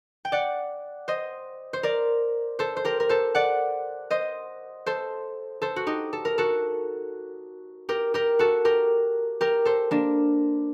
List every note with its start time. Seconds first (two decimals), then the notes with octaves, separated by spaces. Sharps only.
0.25 G5
0.32 D5 F#5
1.08 C5 D#5
1.73 C5
1.83 A#4 D5
2.59 A4 C5
2.77 C5
2.85 G4 A#4
3.00 A#4
3.09 A4 C5
3.35 D5 F#5
4.10 C5 D#5
4.86 A4 C5
5.62 A4 C5
5.76 F#4
5.87 D#4 G4
6.13 A4
6.25 A#4
6.38 F#4 A4
7.89 G4 A#4
8.14 G4 A#4
8.39 F#4 A4
8.65 G4 A#4
9.41 G4 A#4
9.65 A4 C5
9.91 A#3 D4